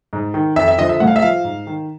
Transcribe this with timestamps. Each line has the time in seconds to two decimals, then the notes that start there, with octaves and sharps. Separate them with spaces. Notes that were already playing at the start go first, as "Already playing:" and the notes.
0.13 G#2
0.34 D#3
0.56 F2 E5
0.68 E5
0.78 D3 F3 D#5
0.89 E5
1.00 A2 F#5
1.07 F5
1.16 E5
1.22 F3 F5
1.44 G#2
1.67 D#3